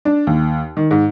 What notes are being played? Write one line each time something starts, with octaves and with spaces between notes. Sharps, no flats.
D4
D#2
D#3
G#2